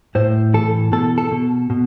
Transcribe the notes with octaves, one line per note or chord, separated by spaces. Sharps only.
A2 C5
E3 A4
B2 A4
A4
B2
B2